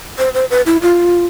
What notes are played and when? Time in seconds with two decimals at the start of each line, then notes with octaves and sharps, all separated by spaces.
0.18 C5
0.34 C5
0.51 B4
0.66 E4
0.82 F4